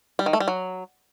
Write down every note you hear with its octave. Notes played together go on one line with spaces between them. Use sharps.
G3
D#3
A3
G3
F#3